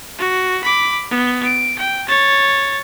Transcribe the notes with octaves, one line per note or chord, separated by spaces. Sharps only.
F#4
B5 D6
B3
D7
G5
C#5 A6